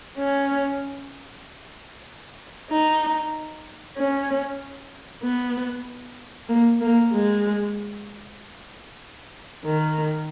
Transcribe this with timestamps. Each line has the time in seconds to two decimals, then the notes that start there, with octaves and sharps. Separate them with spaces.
0.18 C#4
2.71 D#4
3.97 C#4
5.23 B3
6.49 A#3
6.81 A#3
7.13 G#3
9.65 D#3